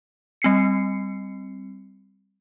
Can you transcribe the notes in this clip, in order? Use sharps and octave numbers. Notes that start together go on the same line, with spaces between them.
G3 C4 C7 C#7